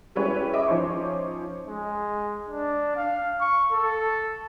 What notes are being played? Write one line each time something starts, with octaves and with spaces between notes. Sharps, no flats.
G3 G#3 C#4 E4 B4 C#5
D#5 E5 D6
F3 C#4 D#4 C5 C#6
G#3
D4
F5
C#6
A4